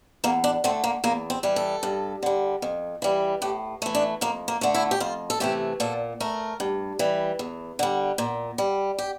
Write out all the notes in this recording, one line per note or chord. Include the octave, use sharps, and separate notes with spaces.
E2 A#3
D4
D3 A3 C4
A#3
E2 A#3
C4
E3 G3
A4
G2
D3 G3
F2
E3 G3
A2 G4
E3 A3
D4
F2 A#3
A#3
D3 A3
E4
G4
F2 F4
A4
C3 E3 A3 G4
A#2 A4
A3 A#4
G2
E3 G3
E2
D3 G3
A#2
G3
G4